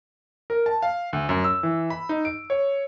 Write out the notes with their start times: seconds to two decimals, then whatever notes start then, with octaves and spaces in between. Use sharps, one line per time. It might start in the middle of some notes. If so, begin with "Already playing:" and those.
0.50 A#4
0.66 A5
0.82 F5
1.13 D2
1.29 F#2
1.44 E6
1.63 E3
1.90 B5
2.09 D#4
2.25 D7
2.50 C#5